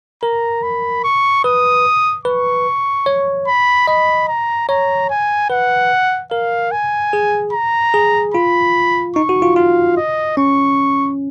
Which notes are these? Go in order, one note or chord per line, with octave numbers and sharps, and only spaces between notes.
A#4 A#5
B5
C#6
B4 D#6
B4 C#6
C#5
B5
D#5 B5
A#5
C#5 A#5
G#5
B4 F#5
A#4 F5
G#5
G#4
A#5
G#4
F4 B5
D#4 C#6
F#4
F4
F4 F5
D#5
C#4 C#6